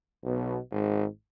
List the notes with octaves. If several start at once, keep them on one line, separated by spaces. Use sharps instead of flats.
B1 B2
G#1 G#2